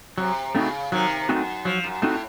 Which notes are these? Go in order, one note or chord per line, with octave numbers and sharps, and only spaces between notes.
C3 F#3
C#3 A3 C4 D#4 F#4
C3 D#3 F#3
F#2 A3 C4 D#4 F#4
F3 F#3
F#2
A2 A3 C4 D#4 F#4